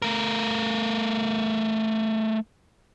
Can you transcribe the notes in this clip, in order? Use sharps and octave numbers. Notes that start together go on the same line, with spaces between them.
A3 A#4